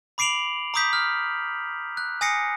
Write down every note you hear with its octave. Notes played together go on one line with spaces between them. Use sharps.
B5 D6 C7 D7 F7 F#7
A#5 C6 D6 D#6 G6 B6
F6
F#6
G#5 D#6 A#6 C7 C#7